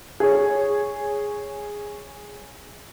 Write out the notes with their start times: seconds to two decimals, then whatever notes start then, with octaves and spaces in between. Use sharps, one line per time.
0.20 G#4 C#5